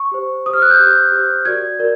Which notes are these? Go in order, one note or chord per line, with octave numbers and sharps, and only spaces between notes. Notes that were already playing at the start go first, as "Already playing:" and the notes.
Already playing: C#6
G4 C5
G4 C5 D#6
F6
F#6
G6
G4 C5
G4 C5
F#4 A#4 D5 G#6
F#4 A#4 D5